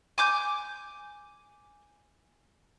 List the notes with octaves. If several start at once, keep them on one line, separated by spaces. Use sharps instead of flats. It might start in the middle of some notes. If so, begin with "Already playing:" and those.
G#5 D6 G6